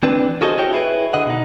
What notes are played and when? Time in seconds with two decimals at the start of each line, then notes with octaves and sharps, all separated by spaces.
0.03 E3 C4 D4 B4
0.41 F4 F#4 G#4 A4 C5 D#5
0.58 E4 F#4 C#5 G5
0.73 E4 G#4 B4
1.13 D3 D#5 F#5
1.27 B2 D#4